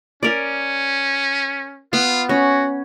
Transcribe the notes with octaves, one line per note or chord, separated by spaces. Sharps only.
C#4 A#4 D5
B3 F4
C#4 F#4